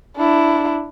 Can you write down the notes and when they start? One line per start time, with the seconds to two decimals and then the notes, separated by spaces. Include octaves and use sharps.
0.17 D4 E4